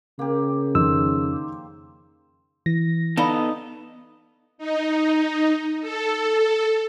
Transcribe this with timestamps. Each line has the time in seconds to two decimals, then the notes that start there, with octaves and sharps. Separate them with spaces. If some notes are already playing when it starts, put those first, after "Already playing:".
0.19 C#3 A#3 G4
0.75 F2 D#3 C5 E6
2.66 E3 A#6
3.17 B3 D#4 A4 D5 F5 B5
4.58 D#4
5.81 A4